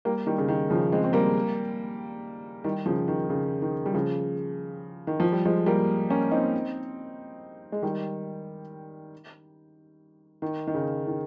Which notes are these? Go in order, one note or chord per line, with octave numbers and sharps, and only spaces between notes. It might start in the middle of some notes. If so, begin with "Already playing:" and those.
G3 A#3
D#3 G3
C#3
D#3
C#3 F3
G#3 C4
C4
G3 A#3
D#3 G3
C#3 F3
D#3
C#3
D#3
G3
C#3 F3
D#3
F3
G3
F3 G#3
G3 A#3
A#3 C#4
C4 D#4
G#3
D#3 G3
D#3
D#3
C#3
D#3